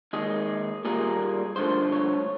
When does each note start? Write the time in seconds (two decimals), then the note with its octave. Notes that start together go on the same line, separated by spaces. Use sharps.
0.13 D#2 D#3 G#3 G#4
0.85 A#2 G3 A#3 G#4
1.56 G2 D3 F3 A3 C5
1.92 C#5